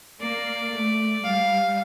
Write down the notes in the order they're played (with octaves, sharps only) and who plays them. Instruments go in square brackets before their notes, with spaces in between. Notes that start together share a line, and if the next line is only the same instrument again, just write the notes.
[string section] A#3 [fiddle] D5
[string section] A3
[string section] G3 [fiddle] F5